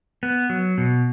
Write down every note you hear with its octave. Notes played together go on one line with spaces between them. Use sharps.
B3
F#3
B2